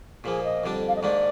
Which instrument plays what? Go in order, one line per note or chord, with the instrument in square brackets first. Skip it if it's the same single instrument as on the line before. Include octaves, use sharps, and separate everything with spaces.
[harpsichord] A#2 F3 A#3 [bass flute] G#4
[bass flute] D#5
[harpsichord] F2 D3 G3 D4
[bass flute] F5
D#5
[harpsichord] G#2 D#3 A#3 D4 [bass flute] D5